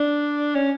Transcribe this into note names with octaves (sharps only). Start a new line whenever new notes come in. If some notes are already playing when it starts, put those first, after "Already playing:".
Already playing: D4
C#4